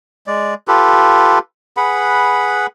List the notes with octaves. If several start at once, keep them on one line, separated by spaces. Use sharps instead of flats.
G#3 D5
F4 G4 A4 B4
G#4 B4 F#5 B5